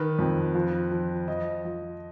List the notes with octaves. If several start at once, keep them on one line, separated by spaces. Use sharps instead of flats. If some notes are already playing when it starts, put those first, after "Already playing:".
Already playing: D#3 B4
F2
F3
F3
F3 D#5
F3